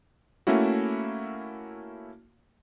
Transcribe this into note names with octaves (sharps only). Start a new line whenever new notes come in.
A3 A#3 C#4 E4 F#4